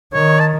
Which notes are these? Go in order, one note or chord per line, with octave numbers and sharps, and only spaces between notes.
D#3 C#5
A5